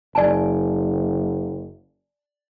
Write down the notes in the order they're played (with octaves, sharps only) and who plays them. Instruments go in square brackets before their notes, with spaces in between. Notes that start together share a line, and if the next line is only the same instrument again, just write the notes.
[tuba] F#1 [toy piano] D5 G#5 A5